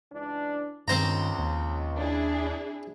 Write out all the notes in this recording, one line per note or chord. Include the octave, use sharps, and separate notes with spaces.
C#2 E3 D4
C#2 G2 D#3 C4 C5 A#5
D#2
D4 E4 G#4